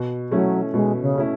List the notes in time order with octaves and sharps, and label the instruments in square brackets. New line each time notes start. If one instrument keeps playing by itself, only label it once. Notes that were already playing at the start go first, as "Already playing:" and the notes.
Already playing: [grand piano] B2
[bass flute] F#3 [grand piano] A3 C#4 E4
[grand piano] B2 [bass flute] G#3
[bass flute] C#3
[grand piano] A3 C#4 E4